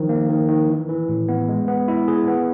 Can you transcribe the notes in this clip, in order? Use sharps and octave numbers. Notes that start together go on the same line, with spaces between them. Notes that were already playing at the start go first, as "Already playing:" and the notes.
Already playing: D#3 F3
A#3
D#3
D#3
E3
E3
A2
B3
G#3
B3
E4
G#4
B3